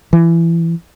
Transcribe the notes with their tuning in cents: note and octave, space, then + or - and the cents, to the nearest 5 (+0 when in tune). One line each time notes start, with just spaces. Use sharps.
E3 +20